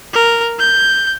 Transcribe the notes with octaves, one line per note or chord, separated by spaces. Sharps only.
A#4
G6